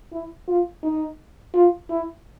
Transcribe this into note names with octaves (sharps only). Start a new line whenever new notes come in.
E4
F4
D#4
F4
E4